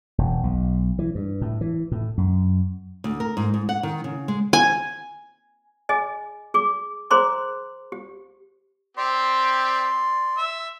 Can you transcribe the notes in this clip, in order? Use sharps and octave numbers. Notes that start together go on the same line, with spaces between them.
E1
B1
E3
G2
A2
E3
A2
F#2
D2
A#4
G#2
G#2
F#5
D#3
C#3
G#3
G#5
G#4 D#5 G#5
G#4 D6
G#4 A#4 C5 A#5 C6 D6
G4
C4 G4 D5 C6
E5